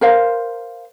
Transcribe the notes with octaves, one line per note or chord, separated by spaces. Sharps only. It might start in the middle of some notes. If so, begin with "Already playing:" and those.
A#4 C5 F5